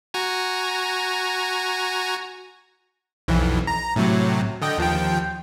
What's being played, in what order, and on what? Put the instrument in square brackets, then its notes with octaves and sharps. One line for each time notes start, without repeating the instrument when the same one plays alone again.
[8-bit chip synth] F#4 G#5 A#5
B1 F2 E3
A#5
A2 C3 F#3
D3 D#5 G5
D#2 F3 G5